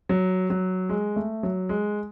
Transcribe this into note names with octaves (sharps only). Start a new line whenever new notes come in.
F#3
F#3
G#3
A3
F#3
G#3